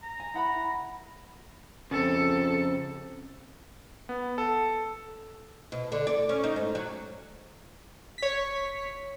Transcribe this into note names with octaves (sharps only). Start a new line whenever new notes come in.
A#5
G#5
E4 F#5 B5
F2 C#3 C4 A4
B3
A4
B2
D3
D5
C#4
D#4
G#2
F#3
E1 C#5 B6